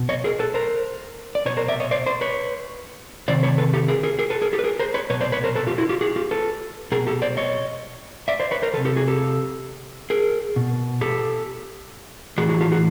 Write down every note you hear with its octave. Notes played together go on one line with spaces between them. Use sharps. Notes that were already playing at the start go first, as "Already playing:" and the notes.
Already playing: B2
C#5 D#5
G#4 A#4
A4 B4
A#4 C5
D5
B2 B4 C#5
A#4 C5
D5 E5
C#5 D#5
C5 D5
C5 D5
B4 C#5
C3 D#3 C5 D5
B4 C#5
A4 B4
G4 A4
G#4 A#4
G#4 A#4
G#4 A#4
A4 B4
G#4 A#4
G4 A4
B4
G#4 A#4
A#4 C5
B4 C#5
B2 B4 C#5
C5 D5
B4 C#5
A#4 C5
A4 B4
F4 G4
E4 F#4
F4 G4
F#4 G#4
F4 G4
A4 B4
B2 G#4 A#4
G4 A4
C5 D5
C#5 D#5
D5 E5
C5 D5
B4 C#5
A#4 C5
D#3 A4 B4
C3
G4 A4
F#4 G#4
G4 A4
G#4 A#4
B2
G4 A4
A2 E3 F#4 G#4
F#4 G#4
F4 G4
F#4 G#4